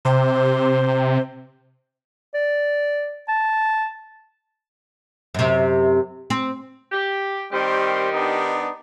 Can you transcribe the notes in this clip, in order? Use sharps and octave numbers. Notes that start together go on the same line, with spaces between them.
C3 C5
D5
A5
F#2 C3
C4
G4
D#3 G3 C4 G4 C5
B3 D4 D#4